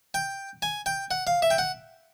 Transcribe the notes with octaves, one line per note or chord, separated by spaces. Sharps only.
G5
G#5
G5
F#5
F5
E5
G5
F#5